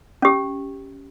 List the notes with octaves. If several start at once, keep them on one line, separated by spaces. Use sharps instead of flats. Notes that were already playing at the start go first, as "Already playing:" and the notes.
C#4 G4